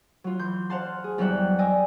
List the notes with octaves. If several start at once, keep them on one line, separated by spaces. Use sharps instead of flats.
F#3 F4
E3 C6 G6
C5 F5 F#5 A5 C6
G#4
E2 F#3 G3 E5 F#5 G5
D5 D#5 G5 G#5 D6 E6